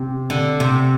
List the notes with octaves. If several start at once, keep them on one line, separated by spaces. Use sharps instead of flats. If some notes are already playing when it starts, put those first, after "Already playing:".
Already playing: C3
D3
C3